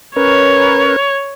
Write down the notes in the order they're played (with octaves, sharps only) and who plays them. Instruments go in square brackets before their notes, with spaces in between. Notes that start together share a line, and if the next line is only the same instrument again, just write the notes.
[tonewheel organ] C#4 A#4 B4 [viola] C#5